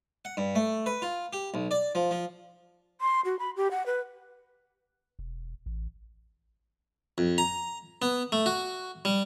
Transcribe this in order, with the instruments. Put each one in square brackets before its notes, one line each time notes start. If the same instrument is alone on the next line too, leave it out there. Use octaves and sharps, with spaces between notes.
[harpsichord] F#5
G2
A3
B4
F4
G4
B1
D5
F3
F3
[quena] C6
F#4
B5
G4
F#5
B4
[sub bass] E1
A1
[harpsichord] F2
A#5
B3
A3
F#4
G3